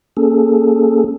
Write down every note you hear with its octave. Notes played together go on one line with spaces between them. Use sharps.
A#3 C#4 G#4 A4